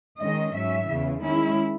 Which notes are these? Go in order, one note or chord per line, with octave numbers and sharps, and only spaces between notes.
D#3 G#3 C#4 D#5
G#2 F#3 C#4 E5
E2 C#3 E3
D#3 G#3 C#4 E4